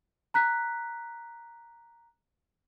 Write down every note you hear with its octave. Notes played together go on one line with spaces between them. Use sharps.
A#5 F#6 B6